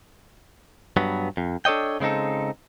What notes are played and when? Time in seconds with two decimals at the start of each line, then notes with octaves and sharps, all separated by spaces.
0.97 G2 F#3 B3
1.37 F2
1.65 D4 A4 C#5 D#5 G5
2.00 C#3 G#3 C4 D#4 A4